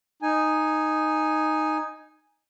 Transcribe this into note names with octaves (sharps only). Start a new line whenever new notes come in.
D#4 G#5